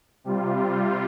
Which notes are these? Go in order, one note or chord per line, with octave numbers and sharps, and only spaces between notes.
C3 G3 F4